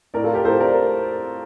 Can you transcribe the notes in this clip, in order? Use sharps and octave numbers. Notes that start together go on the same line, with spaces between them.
A2 A#4 D5
F4 A4
G4 A#4
A2 A4 C5
A#4 D5